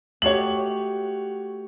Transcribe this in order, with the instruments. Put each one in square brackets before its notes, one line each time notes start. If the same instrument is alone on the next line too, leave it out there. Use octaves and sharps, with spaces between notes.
[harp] A3 F#4 G4 [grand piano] C#5 F#7